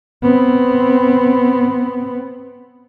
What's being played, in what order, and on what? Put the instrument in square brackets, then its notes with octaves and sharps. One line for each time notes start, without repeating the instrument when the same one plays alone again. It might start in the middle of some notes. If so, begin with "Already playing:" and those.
[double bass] B3 C4